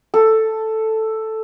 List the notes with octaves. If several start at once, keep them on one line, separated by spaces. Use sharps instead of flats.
A4